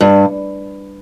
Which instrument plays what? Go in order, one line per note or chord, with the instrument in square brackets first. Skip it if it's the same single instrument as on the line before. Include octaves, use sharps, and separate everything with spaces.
[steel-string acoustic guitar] G2